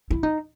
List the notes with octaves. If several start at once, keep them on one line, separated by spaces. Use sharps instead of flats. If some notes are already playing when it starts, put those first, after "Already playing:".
E4
D#4